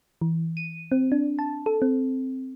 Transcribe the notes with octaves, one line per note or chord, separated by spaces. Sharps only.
E3
D#7
C4
D4
A5
A4
C4